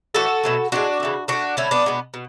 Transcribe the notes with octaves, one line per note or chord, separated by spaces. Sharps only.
A2 E3 A3 F#4 A4
B2 F#3 A3
A2 E3 G#3 D4 F#4
C#3 E3 A3
D3 A3 D4 F#4
D3 A3 C#4 E4
B3 D4
B2 G#3 B3
B2